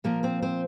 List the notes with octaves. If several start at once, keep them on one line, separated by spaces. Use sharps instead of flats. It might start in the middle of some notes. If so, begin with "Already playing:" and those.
A#2 F3 A#3 A#4
C4 C5
C4 C5